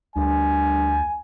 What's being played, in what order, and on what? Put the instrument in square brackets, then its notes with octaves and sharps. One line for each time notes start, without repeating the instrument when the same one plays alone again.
[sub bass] D2 [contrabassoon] G2 [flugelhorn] G#5